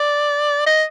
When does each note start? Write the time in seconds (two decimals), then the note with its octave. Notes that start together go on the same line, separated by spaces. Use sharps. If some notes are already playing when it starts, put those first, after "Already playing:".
Already playing: D5
0.66 D#5